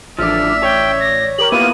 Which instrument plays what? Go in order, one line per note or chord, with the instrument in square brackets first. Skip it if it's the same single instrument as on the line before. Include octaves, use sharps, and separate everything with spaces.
[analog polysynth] A1 D5 [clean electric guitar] D3 F3 [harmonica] E5 [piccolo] F6
[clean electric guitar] C#5 [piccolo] G5
[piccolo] A#6
[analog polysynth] G4 A#4 [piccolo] F#7
[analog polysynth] A#3 B3 [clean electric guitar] E4 F4 [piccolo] D#7